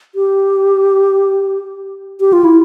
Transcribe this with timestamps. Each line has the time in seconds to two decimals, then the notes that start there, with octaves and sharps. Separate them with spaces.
0.15 G4
2.20 G4
2.33 F4
2.44 E4